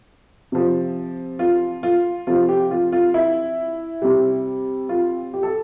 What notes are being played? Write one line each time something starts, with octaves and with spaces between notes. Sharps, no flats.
C3 F3
F4
F4
C3 F3 F4
G4
F4
F4
E4
C3 G3
F4
G4
A4